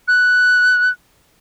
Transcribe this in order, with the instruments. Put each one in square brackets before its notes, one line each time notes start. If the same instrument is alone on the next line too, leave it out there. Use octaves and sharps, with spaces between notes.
[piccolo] F#6